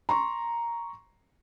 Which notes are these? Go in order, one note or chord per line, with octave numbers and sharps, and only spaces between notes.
A#5 C6 C#6